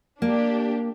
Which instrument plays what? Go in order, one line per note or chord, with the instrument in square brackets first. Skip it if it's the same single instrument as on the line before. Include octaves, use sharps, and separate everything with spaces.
[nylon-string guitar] A#3 [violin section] D4 G4